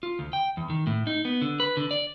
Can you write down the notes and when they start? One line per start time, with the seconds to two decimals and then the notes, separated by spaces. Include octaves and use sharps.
0.03 F4
0.19 D2
0.33 G5
0.57 E2
0.70 D#3
0.87 A2
1.07 D#4
1.25 B3
1.42 D3
1.60 B4
1.77 D3
1.91 D5